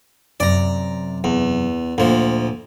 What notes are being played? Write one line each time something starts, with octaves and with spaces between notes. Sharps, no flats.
F#2 C3 D5 A#5
E2
D2 A#2 F3